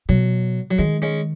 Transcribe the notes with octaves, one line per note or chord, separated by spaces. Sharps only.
B2 F#3
F#3
D#3 G#3
G#3 C#4